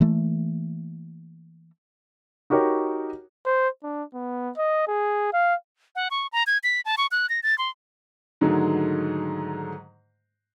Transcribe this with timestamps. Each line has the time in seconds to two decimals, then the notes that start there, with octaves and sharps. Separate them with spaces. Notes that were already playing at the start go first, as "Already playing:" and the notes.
0.01 E3 A3 A#3
2.50 D#4 F#4 G4 A#4 C#5
3.46 C5
3.83 D4
4.14 B3
4.57 D#5
4.87 G#4
5.33 F5
5.96 F#5
6.11 C#6
6.32 A#5
6.47 G#6
6.64 B6
6.85 A5
6.97 C#6
7.11 F#6
7.29 A#6
7.43 A6
7.58 C6
8.41 G#2 D3 D#3 F#3 G#3 A3